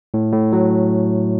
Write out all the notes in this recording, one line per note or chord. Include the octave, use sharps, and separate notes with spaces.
A2
A2
F#3